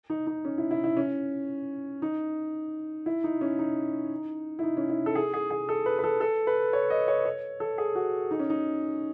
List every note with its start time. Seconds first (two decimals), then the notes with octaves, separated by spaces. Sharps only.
0.10 D#4
0.27 D#4
0.45 C#4
0.58 E4
0.71 E4
0.84 E4
0.97 C#4
2.02 D#4
3.06 E4
3.24 D#4
3.41 C#4
3.59 D#4
4.59 E4
4.63 D#4
4.77 C#4
4.89 E4
5.06 A4
5.15 G#4
5.34 G#4
5.51 G#4
5.69 A4
5.86 B4
5.99 B4
6.04 A4
6.21 A4
6.47 B4
6.73 C#5
6.90 D#5
7.08 C#5
7.25 C#5
7.60 A4
7.78 G#4
7.95 F#4
8.31 D#4
8.40 C#4
8.50 D#4